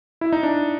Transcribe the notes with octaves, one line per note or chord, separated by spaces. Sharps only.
E4
D#4
D4